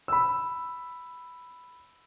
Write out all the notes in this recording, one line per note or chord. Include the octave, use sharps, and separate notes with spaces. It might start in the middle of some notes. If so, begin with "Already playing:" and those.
B5 E6